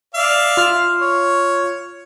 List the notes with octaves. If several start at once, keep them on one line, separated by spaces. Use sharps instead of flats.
D5 E5 F5
F4 F6
C#5